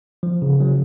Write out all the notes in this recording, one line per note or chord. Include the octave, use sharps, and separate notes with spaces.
F3
C#3
F#3